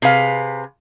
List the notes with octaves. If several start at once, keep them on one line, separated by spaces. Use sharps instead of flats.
C3 G#4 B4 F5